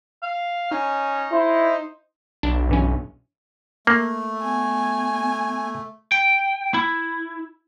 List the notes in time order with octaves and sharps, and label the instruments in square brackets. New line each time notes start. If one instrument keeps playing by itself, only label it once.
[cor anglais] F5
[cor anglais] C#4 [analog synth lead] D#4
[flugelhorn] E4 [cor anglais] C5
[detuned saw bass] B1 [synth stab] D4
[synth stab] G2 E3 C#4
[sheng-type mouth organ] A3 [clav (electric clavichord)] A#3
[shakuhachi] B3 [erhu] G#5
[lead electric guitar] G5
E4